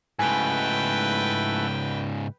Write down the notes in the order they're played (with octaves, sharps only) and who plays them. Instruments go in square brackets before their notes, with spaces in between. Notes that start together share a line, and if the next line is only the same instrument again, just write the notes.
[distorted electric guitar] G#2 C#3 [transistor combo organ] A3 E4 F#4 [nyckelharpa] B4 G5 [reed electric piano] G#5